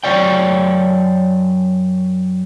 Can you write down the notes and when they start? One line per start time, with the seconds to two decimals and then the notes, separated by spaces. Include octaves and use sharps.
0.04 F#2 A#3 C#5 D5 G5